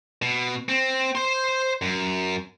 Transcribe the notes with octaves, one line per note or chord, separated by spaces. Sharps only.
B2
C4
C5 C6
F#2